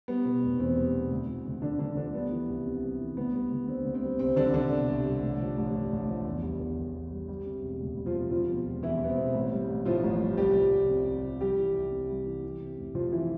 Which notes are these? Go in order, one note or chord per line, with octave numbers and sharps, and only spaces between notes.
G3 B3
B2
F1
E2 C4
G3
B2
D2
F3
D2
D3 D4
D2 D3 D4
D3 F3 D4
G3 B3
E3
C2
C3
G3
E3
D2 B3
G3
D2
D3 C4
D2
C4
G3
C2 C4
D3 G3 D4
C2 D3 D4
B2
C2
G3
A1
F3
A1
G2
A1
F3
E2
G3
E2
D3
E2
G3
G3
C3
E1
D2
G3
F3 F4
C3
F3 G3 F4
B2
E1
E2 E3 E4
G3 B3
C4
B2
A1
G3
A1
A2 F3 F4
A1
G3
C2 G3 G4
F3
C2
C3
C2
F3
G3 G4
E3
C2
C3
G3
E3
E3
C3
F1
F2 F3 F4
E3 E4